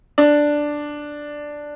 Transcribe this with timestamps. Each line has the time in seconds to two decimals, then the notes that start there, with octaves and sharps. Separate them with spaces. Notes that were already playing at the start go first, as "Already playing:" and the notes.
0.18 D4